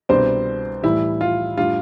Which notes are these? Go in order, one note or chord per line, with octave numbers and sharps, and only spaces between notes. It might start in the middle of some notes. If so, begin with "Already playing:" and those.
C2 B2 B3 C4 D4 C5
A2 E3 G3 E4
F4
A2 G3 D4 F4